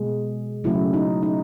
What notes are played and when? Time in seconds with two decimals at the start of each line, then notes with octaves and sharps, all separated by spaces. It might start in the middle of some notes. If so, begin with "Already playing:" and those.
Already playing: B2 G#3
0.64 C#3 F#3 A3 E4
0.94 D#4
1.23 D#4